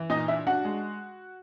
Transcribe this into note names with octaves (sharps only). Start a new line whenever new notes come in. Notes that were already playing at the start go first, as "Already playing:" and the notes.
Already playing: E3
A#2 D#4 D#5
D4 E4 E5
D4 F#4 F#5
G#3